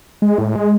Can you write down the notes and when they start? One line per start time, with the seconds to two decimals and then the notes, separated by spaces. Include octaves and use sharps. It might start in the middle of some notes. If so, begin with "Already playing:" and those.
0.22 G#3
0.38 A2
0.56 G#3